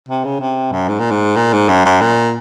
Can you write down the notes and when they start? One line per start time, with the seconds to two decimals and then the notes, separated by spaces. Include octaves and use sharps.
0.09 C3
0.24 C#3
0.40 C3
0.72 F#2
0.88 G#2
0.99 A#2
1.11 G#2
1.37 A#2
1.53 G#2
1.69 F#2
1.85 F#2
2.01 A#2